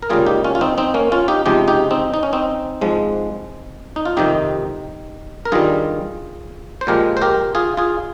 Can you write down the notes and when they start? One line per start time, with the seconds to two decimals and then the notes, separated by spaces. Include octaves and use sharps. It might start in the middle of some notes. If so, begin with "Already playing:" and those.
0.02 A#4
0.10 C#2 C#3 G3 A#3 F4 G#4
0.26 D#4 G4
0.44 C#4 F4
0.55 F4
0.61 C4 D#4
0.78 C4 D#4
0.94 A#3 C#4
1.12 C#4 F4
1.28 D#4 G4
1.46 C#2 C3 F3 G#3 D#4 G4
1.68 D#4 G4
1.91 C4 D#4
2.14 D#4
2.23 C#4
2.33 C4 D#4
2.81 G#2 F3 G#3
3.96 D#4
4.05 F4
4.17 F2 C3 D#3 D#4 G4
5.45 A#4
5.52 G2 D#3 G3 F4 G#4
6.81 C5
6.87 A#2 F3 G#3 G4 A#4
7.17 C5
7.22 G4 A#4
7.55 F4 G#4
7.77 F4 G#4